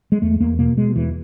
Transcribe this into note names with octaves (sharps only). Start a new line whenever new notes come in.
G#3
E2 A3
E2 A#3
B2 A#3
B2 G#3
E2 E3